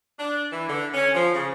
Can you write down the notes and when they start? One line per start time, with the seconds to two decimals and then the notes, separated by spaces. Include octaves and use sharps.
0.19 D4
0.53 E3
0.69 D3
0.94 C#4
1.14 F3
1.34 C#3